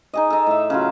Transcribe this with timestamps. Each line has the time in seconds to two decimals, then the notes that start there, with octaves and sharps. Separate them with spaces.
0.13 D#4 G#4 D#5
0.30 D#4 A4
0.46 A2 E5
0.70 C#3 F#3 F4